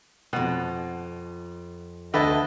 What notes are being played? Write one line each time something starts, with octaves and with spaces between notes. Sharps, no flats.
F2 B2 F#5
D2 D3 B4 D#5 E5 A5